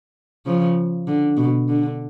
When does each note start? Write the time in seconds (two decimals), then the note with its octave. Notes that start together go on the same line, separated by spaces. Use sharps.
0.46 C#3 F3
1.08 D3
1.37 B2
1.69 D3